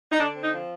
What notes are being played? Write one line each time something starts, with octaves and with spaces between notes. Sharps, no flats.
D#4
D3 D4
C4
D#4
F3